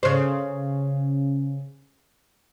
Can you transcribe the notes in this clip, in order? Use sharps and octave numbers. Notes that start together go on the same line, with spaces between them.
C#3 C5